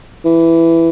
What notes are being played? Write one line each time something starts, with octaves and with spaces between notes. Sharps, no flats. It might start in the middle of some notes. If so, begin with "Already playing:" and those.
E3